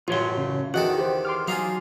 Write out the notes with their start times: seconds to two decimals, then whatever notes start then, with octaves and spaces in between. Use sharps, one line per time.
0.08 A1 F#2 F4 C#5 C6
0.38 C#3
0.74 E2 D#3 F#4 A4 D#5 F#5 G5
0.98 G4 C5
1.25 C6 D6 F6
1.48 F#3 D#4 F4 G#4 F5